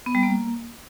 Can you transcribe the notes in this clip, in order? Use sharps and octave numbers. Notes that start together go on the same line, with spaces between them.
B3
G3
A#3